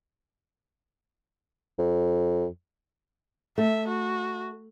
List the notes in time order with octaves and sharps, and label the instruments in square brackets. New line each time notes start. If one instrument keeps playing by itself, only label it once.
[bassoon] F2
[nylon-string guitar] A3 [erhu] E5
[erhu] F#4